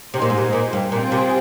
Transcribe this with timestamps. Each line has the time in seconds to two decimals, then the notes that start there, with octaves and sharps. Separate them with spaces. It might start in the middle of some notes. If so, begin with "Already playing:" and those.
0.14 C3 D#4 G#4 C5
0.22 A#2
0.30 G#2
0.38 A#2
0.53 A#2
0.73 G2
0.92 A#2 C4 F4 G#4 C5 G5
1.12 C3